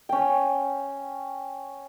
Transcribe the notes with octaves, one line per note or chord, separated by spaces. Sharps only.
C#4 G5